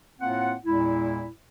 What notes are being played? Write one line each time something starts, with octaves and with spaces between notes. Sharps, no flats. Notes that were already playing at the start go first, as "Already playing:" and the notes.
A2 A#3 C4 F4 F#5
E2 A#2 G#3 E4